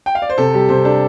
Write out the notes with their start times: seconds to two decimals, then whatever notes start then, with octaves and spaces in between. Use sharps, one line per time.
0.06 G5
0.15 F5
0.22 D5
0.30 C5
0.38 C3 A4
0.54 G3 G4
0.69 C3 C5
0.85 D4 A4